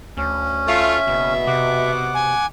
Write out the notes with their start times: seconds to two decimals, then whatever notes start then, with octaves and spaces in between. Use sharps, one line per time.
0.17 D2 C#4
0.68 A3 F4 E5
1.07 F#1 B2
1.47 C3 F#5 D6
2.14 G#5